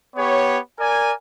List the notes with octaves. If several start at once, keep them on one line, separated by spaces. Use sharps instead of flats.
B3 G4 C#5
A#4 D5 G#5